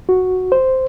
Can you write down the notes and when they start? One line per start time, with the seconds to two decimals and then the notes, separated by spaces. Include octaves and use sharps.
0.09 F#4
0.52 C5